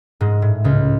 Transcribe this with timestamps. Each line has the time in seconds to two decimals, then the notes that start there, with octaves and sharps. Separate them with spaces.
0.21 G#2 G#3
0.42 A2
0.64 C#2 C#3